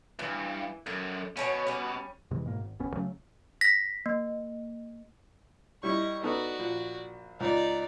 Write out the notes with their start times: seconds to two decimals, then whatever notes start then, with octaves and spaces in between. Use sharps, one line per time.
0.19 C#2 G2 E3
0.86 F#2 D3
1.37 B2 C#4 D#4 C#5
1.67 G3 C#4
2.31 E2 C3 E3 G#3
2.45 F#1 G#2 B2 A#3
2.60 G#1
2.79 D#1 A1 B3 C#4
2.94 C#3 F#3 A3 C#4
3.61 A#6 B6
4.06 A#3
5.83 G3 E4 D#5 C#6
6.23 B3 D#4 F#4 A4 D5
6.59 A#1
7.40 C#2 D#4 D5